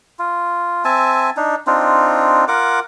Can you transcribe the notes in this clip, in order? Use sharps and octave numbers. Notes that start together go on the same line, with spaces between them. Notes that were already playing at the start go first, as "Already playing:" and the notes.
F4
C4 E5 G#5 A5
D4 D#4
C4 D4 D#4 F4
F4 A#4 F#5 D6